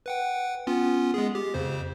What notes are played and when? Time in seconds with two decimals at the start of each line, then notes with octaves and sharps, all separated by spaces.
0.06 B4 F#5 G5
0.67 B3 C#4 F4
1.14 G#3 B3 G#4
1.35 G4
1.54 F2 C#3 C5